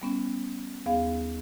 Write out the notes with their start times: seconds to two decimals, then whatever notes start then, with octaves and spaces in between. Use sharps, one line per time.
0.02 G3 B3 C#4
0.86 D#2 B3 G#4 F5